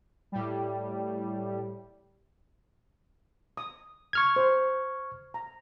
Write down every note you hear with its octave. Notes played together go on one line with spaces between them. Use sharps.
A2 G3
D#6
C#6 F6 G#6
C5
A#5